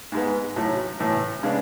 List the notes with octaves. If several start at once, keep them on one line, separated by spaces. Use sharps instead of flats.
G#2 G#3 B3
A1 A2 F#3
A1 A2 E3
C#3 G#3 B3 D4